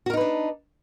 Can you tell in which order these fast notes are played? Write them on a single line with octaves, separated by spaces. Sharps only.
F#4 A#4 D#4 B4 D4